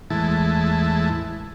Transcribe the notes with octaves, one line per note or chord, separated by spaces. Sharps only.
E2 A2 E3 G#3 E4 A5